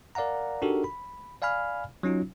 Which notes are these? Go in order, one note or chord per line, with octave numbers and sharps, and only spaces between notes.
A#4 D5 F5 F#5 A#5
D4 D#4 F#4 G4 A4 A#4
B5
D5 F5 G#5 B5 F6
F#3 C#4 D#4 F4